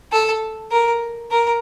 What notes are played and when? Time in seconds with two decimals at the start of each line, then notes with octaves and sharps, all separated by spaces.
0.12 A4
0.71 A#4
1.31 A#4